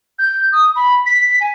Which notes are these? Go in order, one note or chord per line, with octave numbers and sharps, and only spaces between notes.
G6
D#6
B5
B6
G#5